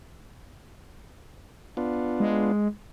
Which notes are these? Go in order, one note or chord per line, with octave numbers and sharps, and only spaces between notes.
B3 D4 F4
G#3